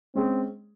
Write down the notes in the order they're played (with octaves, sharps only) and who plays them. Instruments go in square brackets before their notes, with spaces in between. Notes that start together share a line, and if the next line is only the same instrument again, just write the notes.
[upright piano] G#3 C#4 G#4 [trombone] C4